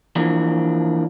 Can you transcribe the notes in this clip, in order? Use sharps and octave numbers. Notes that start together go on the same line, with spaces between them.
E3 F3 A#3 D4